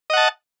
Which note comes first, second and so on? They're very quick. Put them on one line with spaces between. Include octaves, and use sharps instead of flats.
D#5 F#5 A5